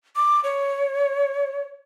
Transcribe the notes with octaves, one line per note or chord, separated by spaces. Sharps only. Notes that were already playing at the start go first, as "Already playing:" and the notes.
D6
C#5